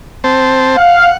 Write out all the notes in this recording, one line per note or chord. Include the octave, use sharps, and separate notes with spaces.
C4 C5 A5
F5 F#5